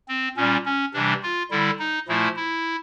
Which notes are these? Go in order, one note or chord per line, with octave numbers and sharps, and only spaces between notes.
C4
A#2 G3 C#4
C#4
C3 E3 G3 D4
F4
D3 G3 E4
D#4
A#2 F3 A3 E4
E4